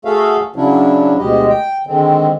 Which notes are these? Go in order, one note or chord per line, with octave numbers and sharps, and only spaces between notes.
A3 F#4 G#4 A4 E5 F5
C#3 F#3 C#4 D4 E4
D2 B2 G#3 G4 D#5
G5
D3 D#3 G#3 C4